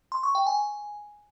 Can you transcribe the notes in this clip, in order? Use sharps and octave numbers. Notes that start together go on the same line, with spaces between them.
C6
C#6
G5
G#5